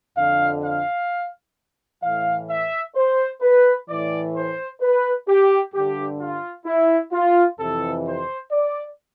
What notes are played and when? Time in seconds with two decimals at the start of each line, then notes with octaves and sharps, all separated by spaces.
0.17 F2 D3 F5
0.63 F5
2.03 A2 E3 F5
2.49 E5
2.95 C5
3.41 B4
3.88 A2 E3 D5
4.35 C5
4.81 B4
5.28 G4
5.73 G2 D3 G4
6.20 F4
6.66 E4
7.12 F4
7.59 F2 C3 E3 A4
8.06 C5
8.51 D5